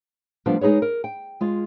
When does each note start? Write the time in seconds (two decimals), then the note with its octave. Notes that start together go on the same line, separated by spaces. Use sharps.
0.46 F3 G3 A3 B3 D4 F4
0.61 G#3 D#4 G#4 B4 C#5
0.82 A#4
1.04 G5
1.41 G#3 F4